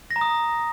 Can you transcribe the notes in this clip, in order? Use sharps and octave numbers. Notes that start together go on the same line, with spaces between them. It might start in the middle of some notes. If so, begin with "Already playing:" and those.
A#6
A#5
D#6